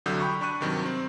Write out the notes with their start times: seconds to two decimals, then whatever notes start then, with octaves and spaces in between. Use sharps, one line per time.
0.06 C2 D3 F#3 D#6 G6
0.20 G5 B5 C#6
0.41 D4 B5 C#6 F#6 D#7
0.61 G2 C3 D#3 F#3 G3
0.86 C4